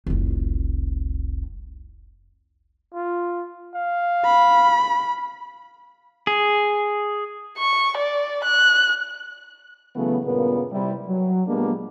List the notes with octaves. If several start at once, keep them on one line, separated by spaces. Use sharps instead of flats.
F1 C2
F4
F5
B5
G#4
C#6
D5
F#6
C#3 E3 F#3 A3 B3
G2 A#2 C#3 B3 A#4 B4
C3 G3 E4
F#3
A#2 G3 G#3 A#3 B3 D4